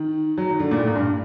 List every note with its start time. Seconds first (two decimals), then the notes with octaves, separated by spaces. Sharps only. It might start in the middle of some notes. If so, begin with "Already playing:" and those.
Already playing: D#3
0.38 F#3
0.50 D#3
0.60 D3
0.71 A#2
0.79 A2
0.87 A#2
0.96 G2